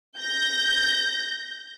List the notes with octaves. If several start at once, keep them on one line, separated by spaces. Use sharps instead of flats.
G6 A#6